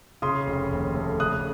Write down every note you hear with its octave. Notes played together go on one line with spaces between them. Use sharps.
C#3 C6 D#6
F1
D#2
A3
C#3 D#6 F#6